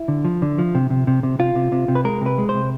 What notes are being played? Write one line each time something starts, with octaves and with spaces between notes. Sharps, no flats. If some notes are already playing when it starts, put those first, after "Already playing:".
Already playing: E4
D3
F3
D3
F3
C3
C3
C3
C3
C3 F4
C3
C3
C3
B4
G#3 A#4
C3 B4
G#3
C5
C3